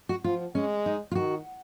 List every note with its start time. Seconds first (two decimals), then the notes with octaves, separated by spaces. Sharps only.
0.09 F#4
0.24 F3 F4
0.55 G#3 C#4
0.86 D#4
1.11 F4
1.15 D#3 F#4